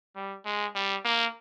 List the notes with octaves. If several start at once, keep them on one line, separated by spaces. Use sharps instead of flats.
G3
G#3
G3
A#3